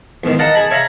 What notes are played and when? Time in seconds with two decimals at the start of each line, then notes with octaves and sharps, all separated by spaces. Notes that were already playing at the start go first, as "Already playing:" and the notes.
0.24 E2 G#2 D#3
0.39 D#5 F5 F#5 A5 A#5
0.55 G#4 A5 B5
0.71 C#5 E5 F5 A#5 B5